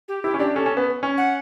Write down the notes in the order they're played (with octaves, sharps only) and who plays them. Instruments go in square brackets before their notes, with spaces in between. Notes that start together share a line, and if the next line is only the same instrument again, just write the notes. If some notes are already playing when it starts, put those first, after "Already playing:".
[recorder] G4
[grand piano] E4 [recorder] G4
[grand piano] C#4
[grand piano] D4 [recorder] G4
[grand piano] C#4 [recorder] A4
[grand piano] C#4
B3
C#4
[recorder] F#5